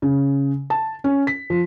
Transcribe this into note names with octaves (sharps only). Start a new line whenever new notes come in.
C#3
A5
C#4
B6
F3